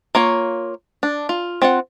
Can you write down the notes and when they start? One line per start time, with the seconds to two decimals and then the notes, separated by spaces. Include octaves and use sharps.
0.15 A#3 F4 C#5
1.03 D4
1.29 F4
1.62 C4 F4 F#5